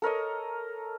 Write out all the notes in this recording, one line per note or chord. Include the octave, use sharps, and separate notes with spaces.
A4 A#4 C#5 D#5